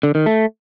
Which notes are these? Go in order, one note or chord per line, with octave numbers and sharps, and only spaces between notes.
D3
D#3
A3